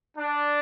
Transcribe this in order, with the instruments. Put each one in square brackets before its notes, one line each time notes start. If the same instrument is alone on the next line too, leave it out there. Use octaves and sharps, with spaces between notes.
[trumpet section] D4